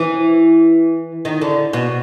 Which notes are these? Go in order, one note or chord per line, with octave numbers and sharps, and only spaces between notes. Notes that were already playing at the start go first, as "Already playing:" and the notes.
Already playing: E3
D#3
D3
B2